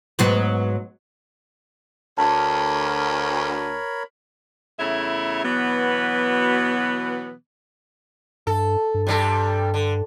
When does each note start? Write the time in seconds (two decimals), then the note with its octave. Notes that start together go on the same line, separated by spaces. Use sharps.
0.19 G#2 F#3 B3
2.18 D2 A#4 C#5 A5 B5
4.79 E2 C#3 A3 E4 C#5 E5
5.44 B2 E3 F#3 B3
8.47 G2 A4
8.94 G2
9.07 C3 G3 A4
9.74 D3